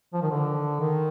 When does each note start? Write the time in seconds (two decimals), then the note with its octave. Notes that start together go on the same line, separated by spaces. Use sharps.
0.13 F3
0.22 D#3
0.31 D3
0.80 D#3